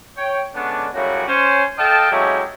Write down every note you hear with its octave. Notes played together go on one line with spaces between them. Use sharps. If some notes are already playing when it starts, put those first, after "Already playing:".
C#5 G5
D3 G#3 B3 C#4 D4
F#2 A2 C#3 G3 A3 F#4
C#4 C5
A4 D#5 F5 G5 A5
F#3 G#3 A3 C#4 E4 G4